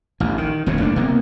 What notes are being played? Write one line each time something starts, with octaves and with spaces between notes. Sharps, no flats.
A1 D2
D#3
E1 D#2 A2 C3
F#1 A3 C4 D4
C3 A#3 B3